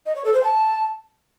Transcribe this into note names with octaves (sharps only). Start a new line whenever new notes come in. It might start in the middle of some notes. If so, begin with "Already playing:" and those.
D#5
C#5
A4
C5
A5